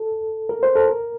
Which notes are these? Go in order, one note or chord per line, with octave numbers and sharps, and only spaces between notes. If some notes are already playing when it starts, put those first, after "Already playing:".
Already playing: A4
A#4
C5
A4
A#4